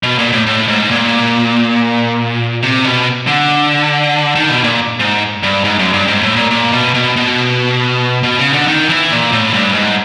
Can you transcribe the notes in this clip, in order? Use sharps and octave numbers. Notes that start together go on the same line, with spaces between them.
B2
A#2
A2
A2
G#2
A#2
C3
B2
D3
D#3
B2
A#2
G#2
G2
G#2
F#2
G2
G#2
A2
A#2
A#2
B2
B2
B2
B2
C#3
D3
D#3
E3
A#2
A2
G2
G#2